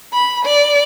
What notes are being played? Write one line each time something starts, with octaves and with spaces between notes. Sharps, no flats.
B5
D5